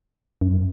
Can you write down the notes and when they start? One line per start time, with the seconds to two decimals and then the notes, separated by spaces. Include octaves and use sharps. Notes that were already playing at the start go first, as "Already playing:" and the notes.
0.41 F#2